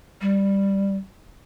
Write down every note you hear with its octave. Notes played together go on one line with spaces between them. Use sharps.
G3